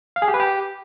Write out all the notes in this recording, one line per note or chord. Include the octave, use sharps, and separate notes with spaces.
F5
G#4
G4
B4
G4